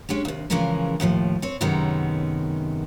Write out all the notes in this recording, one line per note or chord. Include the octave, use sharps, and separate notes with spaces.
G#3 C#4 D4 G4
D#2 C3
C#3 E3 F3 G#3 C#4 A#4
D#2 A2 E3 F3
C4 C#5
F#2 C3 D#3 G#3 B3 C#4